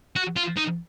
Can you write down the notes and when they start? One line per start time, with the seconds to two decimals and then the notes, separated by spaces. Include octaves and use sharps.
0.16 F#4
0.36 F4
0.57 D#4